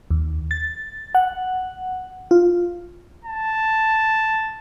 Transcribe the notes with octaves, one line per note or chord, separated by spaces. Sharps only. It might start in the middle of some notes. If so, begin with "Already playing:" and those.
D#2
A6
F#5
F4
A5